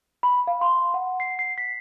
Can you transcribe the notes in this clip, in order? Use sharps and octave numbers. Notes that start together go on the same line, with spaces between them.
B5
F5
C6
F#5
C7
C7
B6